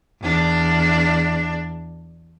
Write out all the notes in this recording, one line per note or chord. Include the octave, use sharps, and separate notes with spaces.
E2 D4